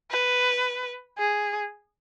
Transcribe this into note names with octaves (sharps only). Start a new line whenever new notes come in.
B4
G#4